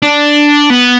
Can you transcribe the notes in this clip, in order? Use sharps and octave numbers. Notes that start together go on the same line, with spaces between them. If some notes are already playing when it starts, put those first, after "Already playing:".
D4
B3